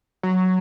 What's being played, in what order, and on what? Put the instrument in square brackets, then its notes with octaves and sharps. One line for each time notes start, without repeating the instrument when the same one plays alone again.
[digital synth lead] F#3